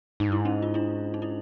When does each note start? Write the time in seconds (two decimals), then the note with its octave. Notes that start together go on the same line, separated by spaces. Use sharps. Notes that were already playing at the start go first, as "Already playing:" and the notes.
0.20 G#2 D#4
0.29 G2 E4
0.38 G#2
0.45 C#4 D#4
0.62 F4
0.74 D4 E4
1.14 D#4
1.22 E4